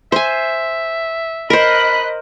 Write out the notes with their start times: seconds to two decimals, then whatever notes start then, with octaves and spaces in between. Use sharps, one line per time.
0.12 C5 E5 G#5
1.50 A#4 C5 D#5 B5 F#6